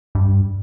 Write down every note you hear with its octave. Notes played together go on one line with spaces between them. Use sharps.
G2